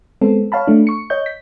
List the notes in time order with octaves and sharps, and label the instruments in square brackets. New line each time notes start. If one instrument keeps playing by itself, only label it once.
[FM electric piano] G#3 B3 C4 A4
C#5 F5 A5 B5
A3 D4
C#6 C#7
C#5 D#5 G6
B6